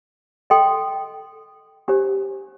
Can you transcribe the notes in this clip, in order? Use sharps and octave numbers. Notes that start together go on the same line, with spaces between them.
A4 D#5 G5 C6
D4 G4 C5